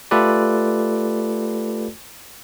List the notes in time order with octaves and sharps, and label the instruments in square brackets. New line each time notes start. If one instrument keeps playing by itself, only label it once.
[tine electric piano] A3 F4 G4 A4 B4 D5